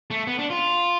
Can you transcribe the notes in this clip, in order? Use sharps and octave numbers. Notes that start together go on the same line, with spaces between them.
A3
B3
D4
F4